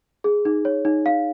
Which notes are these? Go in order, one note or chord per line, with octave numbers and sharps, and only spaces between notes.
G#4
D#4
C#5
D#4
F5